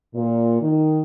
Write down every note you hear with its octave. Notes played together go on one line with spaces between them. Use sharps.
A#2
D#3